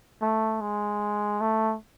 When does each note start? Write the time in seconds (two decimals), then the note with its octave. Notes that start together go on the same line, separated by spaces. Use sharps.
0.22 A3
0.61 G#3
1.41 A3